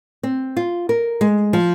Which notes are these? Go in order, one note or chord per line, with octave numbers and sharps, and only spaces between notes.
C4
F4
A#4
G#3
F3